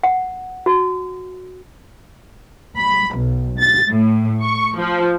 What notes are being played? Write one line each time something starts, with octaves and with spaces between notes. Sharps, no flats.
F#5
F#4
B5
B1
A6
A2
C#6
F3